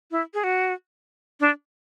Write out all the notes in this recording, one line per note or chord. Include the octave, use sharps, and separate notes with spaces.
E4
G#4
F#4
D4